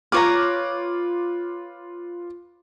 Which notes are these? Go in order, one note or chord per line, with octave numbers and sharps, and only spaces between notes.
F4 B4 C#5 A#5 D6 F6